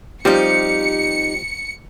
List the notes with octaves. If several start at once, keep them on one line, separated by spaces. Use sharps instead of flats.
F3 G3 C4 D#4 G4 C#7